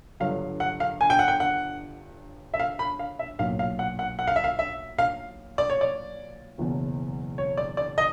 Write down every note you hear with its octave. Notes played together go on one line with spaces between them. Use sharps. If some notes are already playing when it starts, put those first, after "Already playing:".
G1 G2 D3 F#3 F5
F#5
F5
G#5
G5
F#5
G5
F#5
E5
F5
B5
F5
E5
B1 A#2 F#3 F5
F5
F#5
F#5
F#5
F5
E5
F5
E5
F5
D5
C#5
D5
F#1 E2 B2 F#3
C#5
D5
D5
D#5